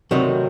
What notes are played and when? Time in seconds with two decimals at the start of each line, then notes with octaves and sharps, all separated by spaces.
0.11 D2 C3 D#3 F#3